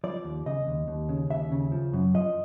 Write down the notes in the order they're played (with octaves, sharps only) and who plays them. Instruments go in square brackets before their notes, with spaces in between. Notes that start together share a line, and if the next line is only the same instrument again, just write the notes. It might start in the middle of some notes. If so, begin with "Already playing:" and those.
[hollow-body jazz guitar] F3 D5
D#2
C#3 D#5
D#2
D#2
C#3
D#2 E5
C#3
F3
F#2
F3 D#5